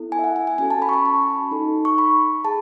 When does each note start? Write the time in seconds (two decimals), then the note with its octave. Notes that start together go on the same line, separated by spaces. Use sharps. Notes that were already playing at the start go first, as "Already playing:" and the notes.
Already playing: B3 E4 A4
0.12 G#5
0.19 E5
0.24 F#5
0.36 G#5
0.47 G#5
0.58 C#4 F#4 A4 G#5
0.70 A5
0.82 B5
0.89 C#6
0.93 B5
1.06 A5
1.51 D#4 A4
1.85 C#6
1.98 B5
2.44 G#4 A5